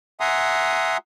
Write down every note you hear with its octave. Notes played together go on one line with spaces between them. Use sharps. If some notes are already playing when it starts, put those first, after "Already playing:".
E5 F#5 G#5 A#5 C6 D#6